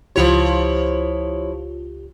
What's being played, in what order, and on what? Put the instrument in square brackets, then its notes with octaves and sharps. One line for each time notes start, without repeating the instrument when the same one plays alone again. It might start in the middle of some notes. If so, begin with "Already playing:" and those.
[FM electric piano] C#2 F4 G4 [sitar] F3 E4 C#5